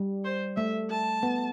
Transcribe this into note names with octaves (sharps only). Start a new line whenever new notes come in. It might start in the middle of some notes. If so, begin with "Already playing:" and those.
Already playing: G3
C5
A3 E5
A5
B3